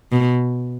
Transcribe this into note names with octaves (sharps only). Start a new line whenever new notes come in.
B2